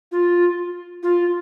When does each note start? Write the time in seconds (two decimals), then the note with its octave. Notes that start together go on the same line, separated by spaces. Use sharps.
0.12 F4
1.03 F4